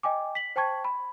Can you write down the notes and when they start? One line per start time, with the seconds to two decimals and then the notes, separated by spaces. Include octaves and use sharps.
0.03 D#5 G5 G#5 D6
0.35 B6 F#7
0.56 C5 G5 A5 C#6 G#6
0.84 B5